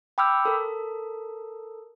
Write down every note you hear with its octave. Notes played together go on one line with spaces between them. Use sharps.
G5 B5 D6 E6 F6 G6
A4 A#4